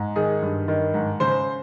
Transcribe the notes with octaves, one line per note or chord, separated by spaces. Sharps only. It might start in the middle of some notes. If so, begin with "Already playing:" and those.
Already playing: G#2
D#3 G#4
G2
D#3
G#2
C#3 C5